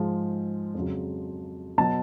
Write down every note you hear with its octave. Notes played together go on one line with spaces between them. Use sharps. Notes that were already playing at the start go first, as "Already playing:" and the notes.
Already playing: G#2 F3 G#3
F2 C#3 F#3
B2 F#3 A5